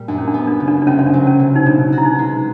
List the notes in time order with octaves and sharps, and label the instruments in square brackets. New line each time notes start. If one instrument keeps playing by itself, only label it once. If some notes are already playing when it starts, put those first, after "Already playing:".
Already playing: [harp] A#2 G3
[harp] F#2 [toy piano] D4
[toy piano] C#4
D4
[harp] B3
[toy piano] D4
[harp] C#3
[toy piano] D4
D4
[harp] C2 [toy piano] C#4
[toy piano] C#4
D4
[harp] F#3
[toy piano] C#4
[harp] C3
[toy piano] D#4
[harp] B2 [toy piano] D4
[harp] F#4
[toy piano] E4
D#4
[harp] G#3